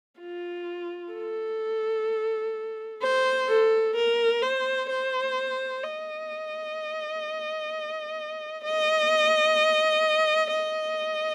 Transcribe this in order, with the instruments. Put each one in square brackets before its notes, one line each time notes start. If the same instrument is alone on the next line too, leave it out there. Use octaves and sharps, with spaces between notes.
[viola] F4
A4
C5
A4
A#4
C5
C5
D#5
D#5
D#5